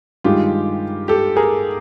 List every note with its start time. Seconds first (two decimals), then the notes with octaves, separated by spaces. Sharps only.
0.24 G2 D#3 G#3 F4 G4
1.08 G4 A4
1.36 G#4 A#4